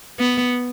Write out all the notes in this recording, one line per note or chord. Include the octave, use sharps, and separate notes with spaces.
B3